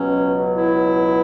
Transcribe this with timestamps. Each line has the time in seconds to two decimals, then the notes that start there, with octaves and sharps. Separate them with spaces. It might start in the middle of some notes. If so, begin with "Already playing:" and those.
Already playing: C#2 B2 F#3 C#4
0.55 E4